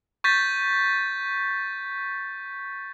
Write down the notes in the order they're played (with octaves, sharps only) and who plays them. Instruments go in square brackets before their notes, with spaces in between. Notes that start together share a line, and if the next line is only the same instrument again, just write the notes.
[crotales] C#6 G6 A6 B6